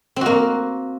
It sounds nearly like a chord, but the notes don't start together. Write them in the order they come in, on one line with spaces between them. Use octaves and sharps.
C4 F#4 A#3